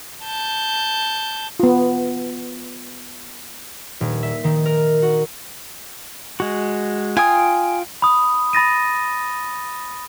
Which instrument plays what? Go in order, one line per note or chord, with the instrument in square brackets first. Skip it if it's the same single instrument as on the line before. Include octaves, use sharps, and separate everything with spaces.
[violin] A5 G6
[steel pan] B3 F4
[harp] D#1
E5
D#3
A#4
F#4
[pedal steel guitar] G#3 F#4
[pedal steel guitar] F4 G5 D#6 [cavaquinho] G#5
[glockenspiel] B5 D#6
B5 A6 A#6 D#7